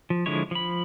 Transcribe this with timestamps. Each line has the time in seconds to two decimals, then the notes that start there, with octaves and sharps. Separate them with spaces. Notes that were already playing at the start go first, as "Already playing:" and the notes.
0.10 F3
0.26 D3 F3 G#3 E4 C#5
0.51 F3 B5